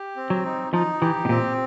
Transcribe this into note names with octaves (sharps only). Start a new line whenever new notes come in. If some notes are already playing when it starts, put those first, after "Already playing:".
Already playing: G4
C4
F#3
D#4
F3 D#4
E3 G4
B2
A#2 C4